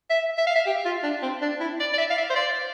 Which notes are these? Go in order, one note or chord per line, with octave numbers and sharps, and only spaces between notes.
E5
E5
F5
E5
G4
F4
D4
C4
D4
E4
D5
D5
E5
F5
E5
C5
D5